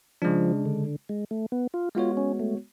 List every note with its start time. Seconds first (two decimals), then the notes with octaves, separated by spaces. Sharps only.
0.22 C#3 F3 G#3 D4
0.66 D3
1.09 G#3
1.31 A3
1.52 B3
1.74 F4
1.95 G#3 B3 F4 F#4 C#5
2.17 C#4
2.40 A3